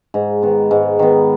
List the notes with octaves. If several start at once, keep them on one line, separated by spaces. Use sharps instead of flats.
G#2
D#3 B3
G#2
D#3 B3